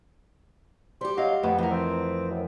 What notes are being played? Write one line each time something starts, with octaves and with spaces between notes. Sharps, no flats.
G3 G4 C5
F#3 C5 D#5 F5
F2 A3 B3
E3 F3 B3 A#4
C4
F#2